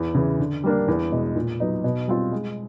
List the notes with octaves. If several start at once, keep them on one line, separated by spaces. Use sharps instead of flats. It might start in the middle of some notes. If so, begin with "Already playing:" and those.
Already playing: E2
C#3 E3
D3
G3 A#3 D4
E2
B2 G#3
A#2
F#3 B3 D#4
B2
G3 C4 F4
G#3